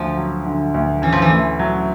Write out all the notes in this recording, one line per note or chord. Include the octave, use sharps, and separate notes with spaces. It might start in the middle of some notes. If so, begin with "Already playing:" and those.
Already playing: D2 F3
F#3
D3
D2
E3 C#4
F3
E3
A3
F#3